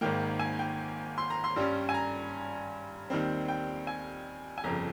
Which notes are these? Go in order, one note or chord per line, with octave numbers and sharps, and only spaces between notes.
G#1 G#2 D#3 A#3 G5
G#5
G5
C6
A#5
C6
G2 G3 C#4
G#5
A#5
D#2 D#3 G3 C4
G5
G#5
G#5
G1 F2 C#3 F3 A#5